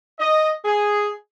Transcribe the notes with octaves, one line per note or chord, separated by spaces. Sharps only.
D#5
G#4